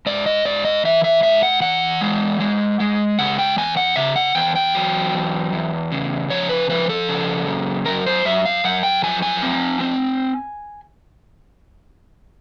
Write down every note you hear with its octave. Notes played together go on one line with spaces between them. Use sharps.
G#2 D5
D#5
G#2 D5
D#5
E3 E5
E5
G#2 E5
F#5
E3 F#5
G#3
G#3
G#3
C#3 F#5
G5
E2 G#5
F#5
C#3 E5
F#5
E2 G5
G5
F#3
E2
E2
C#3
F3 C#5
B4
F3 B4
A4
C#3
F#2
F#2 A#4
C5
F#2 E5
F5
F#2 F#5
G5
F3 G#5
G#5
C4
C4